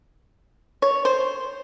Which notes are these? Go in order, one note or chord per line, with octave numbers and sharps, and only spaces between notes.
C#5
C5